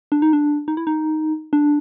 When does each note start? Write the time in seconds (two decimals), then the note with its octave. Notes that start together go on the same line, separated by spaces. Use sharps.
0.12 D4
0.22 D#4
0.33 D4
0.68 D#4
0.77 E4
0.87 D#4
1.53 D4